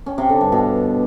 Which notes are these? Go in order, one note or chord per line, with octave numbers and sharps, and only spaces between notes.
C#4
C3
D3
G2
B2